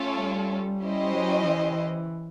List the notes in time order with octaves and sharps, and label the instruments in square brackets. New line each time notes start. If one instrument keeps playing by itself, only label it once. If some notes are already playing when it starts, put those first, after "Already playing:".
Already playing: [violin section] A3 C#4 F4 A4 C#5
[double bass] G3
[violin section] C#4 E4 G4 C5 D#5
[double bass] F#3
E3